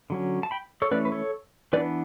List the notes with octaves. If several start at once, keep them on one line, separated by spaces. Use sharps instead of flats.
D3 F#3 C#4
A5
G5 B5
A4 C#5
E3 A3 C#4 B4 D5
B4
A4 C#5
E3 B3 D4 B4 D5